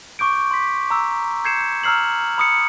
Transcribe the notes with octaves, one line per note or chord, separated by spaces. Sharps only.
C#6 D6 G6 D7
C6 B6
A#5 E6
G6 G#6 C7 C#7 E7
A#5 E6 F6 C7 F#7
B5 D#6 C#7